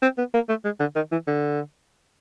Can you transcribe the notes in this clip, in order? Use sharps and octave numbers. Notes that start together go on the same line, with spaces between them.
C4
B3
A#3
A3
G#3
D3
D#3
E3
D3